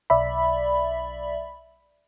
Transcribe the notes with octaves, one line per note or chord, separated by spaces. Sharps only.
B1 D5 E5 B5